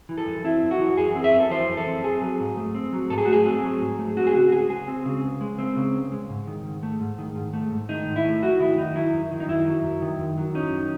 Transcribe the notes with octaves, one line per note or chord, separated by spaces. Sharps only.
E3
A4
F#2
C4 E4
F#2
F#4
E3
F#2 G#4
C4
E5
F#2
A4
E3 C5
F#2
A4
C4
C4 G#4
F#3
G#2
A3
C4
F#3
G#2 A4
G#4
F#4
A3 G#4
C4
F#3
G#2
A3
C4 F#4
G#4
C#3 F#4
C#2 G#4
G#3 G#4
C4
C#3
C#2
G#3
C4
C#3
C#2
G#3
G#2
D#3
G#2
A3
G#2
D#3
G#2
A3
G#2
D#3 D#4
G#2
E4
A3
F#2 F#4
D#3 E4
F#2 D#4
F#3 E4
F#2
D#3
D#4
F#2 E4
F#3
F#2
D#3
F#2
F#3
C#4 D#4
D#3